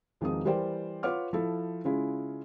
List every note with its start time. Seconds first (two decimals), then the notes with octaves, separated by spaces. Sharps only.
0.21 E1 D#3 F3 C4 D#4 D#6
0.45 E3 G3 A#4 C5 D5 G5
1.03 F4 B4 C#5 F#5 D6 F6
1.33 F3 E4 A4
1.85 C#3 G#3 C#4 E4 F4